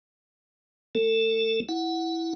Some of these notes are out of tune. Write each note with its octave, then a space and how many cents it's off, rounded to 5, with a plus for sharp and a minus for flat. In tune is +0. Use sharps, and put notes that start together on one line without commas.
A3 +0 A4 +35
E4 +0 F#5 +0